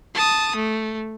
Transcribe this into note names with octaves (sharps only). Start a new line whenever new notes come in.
A5 D#6
A3